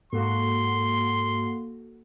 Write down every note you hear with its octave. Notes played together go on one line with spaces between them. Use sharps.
G#2 A#3 F#4 A4 C6